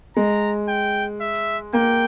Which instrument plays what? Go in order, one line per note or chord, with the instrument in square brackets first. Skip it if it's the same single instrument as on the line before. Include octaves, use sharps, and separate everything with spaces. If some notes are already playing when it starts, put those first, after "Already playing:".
[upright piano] G#3 [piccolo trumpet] A#5
[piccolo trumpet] G5
E5
[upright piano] A#3 [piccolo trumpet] G5